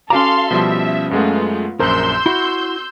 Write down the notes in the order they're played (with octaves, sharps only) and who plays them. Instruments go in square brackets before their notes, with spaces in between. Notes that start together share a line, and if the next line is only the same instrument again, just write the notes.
[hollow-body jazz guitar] C#4 F#4 A#5 [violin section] A4 F5 C6 [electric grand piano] D6
[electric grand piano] B2 F3 G3 [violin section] E5
[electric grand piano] F#2 G#3 A3 [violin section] B3 F4
[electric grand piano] A#1 F#2 C5 [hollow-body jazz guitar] A#4 [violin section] C6 E6 G6
[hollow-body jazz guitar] E4 [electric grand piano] F#4